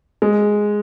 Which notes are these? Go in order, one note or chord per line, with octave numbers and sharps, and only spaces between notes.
G#3